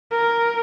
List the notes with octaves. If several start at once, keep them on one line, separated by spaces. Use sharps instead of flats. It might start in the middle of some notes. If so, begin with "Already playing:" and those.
A#4